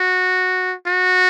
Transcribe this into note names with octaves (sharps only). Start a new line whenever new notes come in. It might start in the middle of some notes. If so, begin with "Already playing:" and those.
Already playing: F#4
F#4